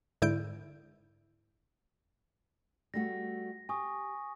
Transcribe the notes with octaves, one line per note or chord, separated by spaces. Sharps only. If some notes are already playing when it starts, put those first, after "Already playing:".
G#2 D3 E4 G6 D7
G3 A3 F#4 A#6
G4 G#5 C#6 D#6